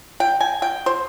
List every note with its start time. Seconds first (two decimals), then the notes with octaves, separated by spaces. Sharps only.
0.20 G5
0.41 G#5
0.62 G5
0.86 C5